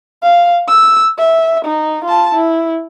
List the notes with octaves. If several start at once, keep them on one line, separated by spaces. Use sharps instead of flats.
F5
E6
E5
D#4
F4 A5
E4